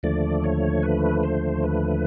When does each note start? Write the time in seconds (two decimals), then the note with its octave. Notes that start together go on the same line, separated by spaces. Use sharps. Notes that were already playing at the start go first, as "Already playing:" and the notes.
0.03 D#2 D3 F3 A3 D5
0.44 C#5
0.83 B4
1.23 C5
1.64 B4